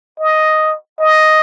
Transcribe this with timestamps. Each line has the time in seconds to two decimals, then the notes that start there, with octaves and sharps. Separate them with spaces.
0.19 D#5
1.00 D#5